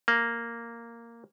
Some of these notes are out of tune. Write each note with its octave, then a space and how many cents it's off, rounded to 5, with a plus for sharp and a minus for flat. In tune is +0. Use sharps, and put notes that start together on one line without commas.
A#3 -5